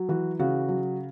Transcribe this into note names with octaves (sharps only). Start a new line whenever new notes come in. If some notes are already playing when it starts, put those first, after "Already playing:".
Already playing: F#3
E3 F#4
C#3 F#4
F#3